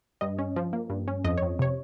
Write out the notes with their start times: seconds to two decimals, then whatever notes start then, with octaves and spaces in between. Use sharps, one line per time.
0.21 G2 D#5
0.39 C#4
0.56 F3
0.73 A#3
0.90 G2
1.08 C#4
1.24 F2 D#5
1.38 F2 C#5
1.59 C3 C#5